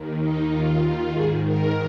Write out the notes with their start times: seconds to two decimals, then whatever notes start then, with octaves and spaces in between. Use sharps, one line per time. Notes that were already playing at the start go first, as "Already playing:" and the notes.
Already playing: D#2 D#3
0.21 D#4
0.52 D#2 D#3 F4
1.14 G#2 D#3 G#4
1.46 A#4